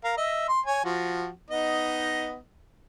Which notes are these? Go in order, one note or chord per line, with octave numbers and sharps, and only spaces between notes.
A#4 F5
D#5 E5
C6
C#5 G#5
F3 F#4
B3 D#4 D#5